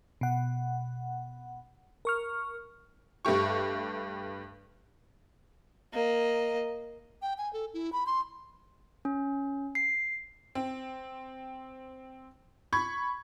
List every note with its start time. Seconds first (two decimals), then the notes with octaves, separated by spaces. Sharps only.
0.21 B2 F#5
2.05 A#4 C#6 F6
3.25 G2 A3 G4 C#6
5.93 A#3 D#5
7.22 G5
7.38 G#5
7.53 A4
7.74 E4
7.93 B5
8.06 C6
9.05 C#4
9.75 C7
10.55 C4
12.73 B5 C#6 G#6